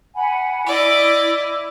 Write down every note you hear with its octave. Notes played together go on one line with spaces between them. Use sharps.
F#5 G#5 B5
E4 D5 D#5